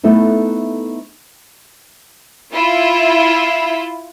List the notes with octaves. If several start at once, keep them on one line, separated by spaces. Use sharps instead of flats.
A3 B3 D#4 E4 A4 B4
E4 F4